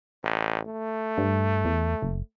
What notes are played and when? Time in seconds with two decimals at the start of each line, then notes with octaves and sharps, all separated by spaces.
0.23 A1
0.67 A3
1.18 G2
1.65 E2
2.03 F#1